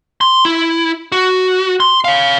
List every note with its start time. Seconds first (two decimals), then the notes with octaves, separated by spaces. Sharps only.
0.21 C6
0.45 E4
1.12 F#4
1.80 C6
2.04 C#5 F5